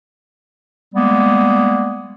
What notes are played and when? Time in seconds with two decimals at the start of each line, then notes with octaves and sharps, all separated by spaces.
0.95 G3 G#3 A#3 B3